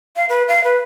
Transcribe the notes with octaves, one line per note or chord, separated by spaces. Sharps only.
F5
B4
F5
B4